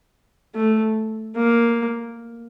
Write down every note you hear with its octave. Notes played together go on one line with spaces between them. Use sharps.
A3
A#3